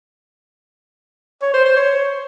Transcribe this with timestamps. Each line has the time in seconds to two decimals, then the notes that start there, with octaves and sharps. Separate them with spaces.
1.42 C#5
1.54 C5
1.65 C5
1.77 C#5